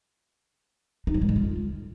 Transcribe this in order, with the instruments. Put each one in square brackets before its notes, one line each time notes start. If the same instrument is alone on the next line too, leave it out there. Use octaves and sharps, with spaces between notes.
[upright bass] D#4
F3
G#3
D3
F4